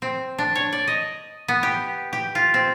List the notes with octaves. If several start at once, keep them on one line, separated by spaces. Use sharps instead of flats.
C4
D4
C#5
D5
D#5
B3
G4
G4
F4
C4